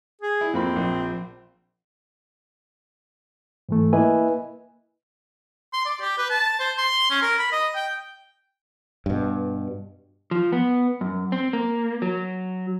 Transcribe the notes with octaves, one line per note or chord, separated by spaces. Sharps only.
G#4
E4
F2 A#3 C4 B5
A#1
G#2 E3 A3
A#3 E4 B4 D#5 E5 G#5
C6
D5
G4
B4
A5
C5
C6
C#4
A#4
B5
D#5
G5
G2 B2
F3
B3
F#2
C4
A#3
F#3